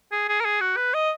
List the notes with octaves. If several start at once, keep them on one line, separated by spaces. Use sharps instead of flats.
G#4
G#4
A#4
G#4
F#4
B4
D#5